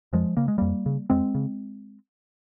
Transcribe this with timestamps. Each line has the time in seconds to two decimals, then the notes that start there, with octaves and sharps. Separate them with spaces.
0.13 F2 F3 G#3
0.37 C#3 A#3
0.48 G#3
0.58 F2 G3 A#3
0.86 C#3
1.10 F2 G#3 C4
1.35 C#3